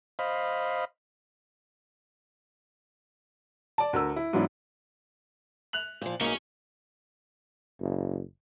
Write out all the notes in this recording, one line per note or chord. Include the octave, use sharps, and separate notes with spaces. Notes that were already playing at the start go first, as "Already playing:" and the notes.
C5 D#5 F5 B5
D5 A5
D2 A#4 E6
E4
G#2 E3 F#3 B3 D4 E4
F#6 F7 F#7
A#2 F3
B1 A#3 C#4 D#4 G#4
F#1